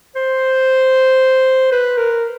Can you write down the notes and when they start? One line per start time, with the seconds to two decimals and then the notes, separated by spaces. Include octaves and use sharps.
0.16 C5
1.72 B4
1.97 A#4